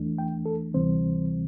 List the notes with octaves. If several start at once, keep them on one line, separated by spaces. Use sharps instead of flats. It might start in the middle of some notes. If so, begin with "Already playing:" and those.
Already playing: E2 E3 A3 D4
G5
A4
D2 C3 E3 G3 C4 C5